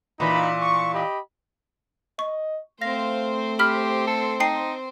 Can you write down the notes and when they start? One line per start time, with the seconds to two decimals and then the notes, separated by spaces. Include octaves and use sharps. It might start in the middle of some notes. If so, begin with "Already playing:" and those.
0.20 A#2 E3 D#4 B5
0.62 C#6
0.94 G4 D#5 B5
2.19 D#5 C#6
2.82 A3 C4 C5 F5 A#6
3.59 G4 B5 F6 B6
4.07 A4
4.40 D#4 G5 A5 C7